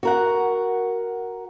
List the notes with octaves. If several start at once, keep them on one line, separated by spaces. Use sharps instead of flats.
F#4 A#4 F#5